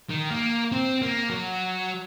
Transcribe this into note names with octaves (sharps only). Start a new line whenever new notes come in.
D#3
A#3
C4
A#3
F#3